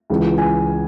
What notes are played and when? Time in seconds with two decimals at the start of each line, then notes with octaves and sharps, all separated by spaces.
0.10 C#2 C#3 E3
0.38 G#5